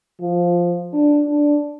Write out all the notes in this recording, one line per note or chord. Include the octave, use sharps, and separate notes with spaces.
F3
D4
D4